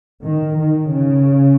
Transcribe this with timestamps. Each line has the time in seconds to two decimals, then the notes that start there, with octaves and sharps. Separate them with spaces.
0.24 D#3
0.58 D#3
0.92 C#3